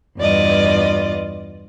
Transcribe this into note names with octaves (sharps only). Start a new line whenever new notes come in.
E2 G2 F4 D5 D#5